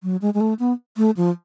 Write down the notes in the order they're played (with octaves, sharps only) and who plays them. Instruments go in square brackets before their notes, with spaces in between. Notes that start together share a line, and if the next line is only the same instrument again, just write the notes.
[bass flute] F#3
G#3
G#3
A3
B3
A3
F3